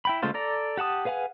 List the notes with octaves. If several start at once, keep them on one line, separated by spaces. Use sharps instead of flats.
E4 G5 B5
C#3 G#3 A3 F4 C5
A4 D5 A#5
G4 F#5 A5 D#6
G#4 B4 F5 F#5 G#5